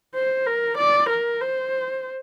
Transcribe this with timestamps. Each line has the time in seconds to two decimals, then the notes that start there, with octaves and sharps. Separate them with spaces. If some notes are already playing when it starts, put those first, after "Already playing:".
0.14 C5
0.46 A#4
0.78 D5
1.09 A#4
1.41 C5